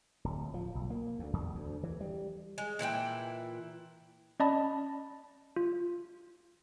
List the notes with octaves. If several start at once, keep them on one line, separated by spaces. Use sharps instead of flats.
D1
F3
B1
A#3
D2
E2
D2
E3
G3
G#3
A#2 E3 E4 G5
C#4 D5 D#5 A5 B5
F4